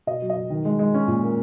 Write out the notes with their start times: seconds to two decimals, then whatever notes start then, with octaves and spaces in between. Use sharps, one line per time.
0.07 B2 D#5
0.22 F#3
0.30 D#5
0.36 B2
0.50 D#3
0.65 G#3
0.79 G#3
0.94 C#4
1.08 A#2
1.23 A#3